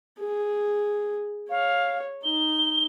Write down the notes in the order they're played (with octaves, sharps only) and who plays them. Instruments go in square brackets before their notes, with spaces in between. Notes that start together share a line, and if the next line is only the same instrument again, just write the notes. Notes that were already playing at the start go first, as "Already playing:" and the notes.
[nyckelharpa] G#4
[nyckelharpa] C#5 [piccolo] F5
[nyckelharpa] D#4 [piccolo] G7